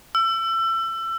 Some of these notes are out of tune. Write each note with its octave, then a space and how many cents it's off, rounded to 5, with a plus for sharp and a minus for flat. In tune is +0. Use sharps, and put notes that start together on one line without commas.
E6 +30